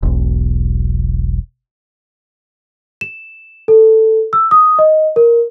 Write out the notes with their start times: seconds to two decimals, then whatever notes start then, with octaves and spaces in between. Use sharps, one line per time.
0.03 E1 B1
3.01 E7
3.68 A4
4.33 E6
4.51 D#6
4.79 D#5
5.16 A#4